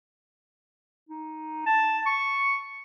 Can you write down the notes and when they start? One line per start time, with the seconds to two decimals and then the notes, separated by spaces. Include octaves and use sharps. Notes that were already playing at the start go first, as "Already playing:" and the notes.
1.09 D#4
1.67 A5
2.06 C#6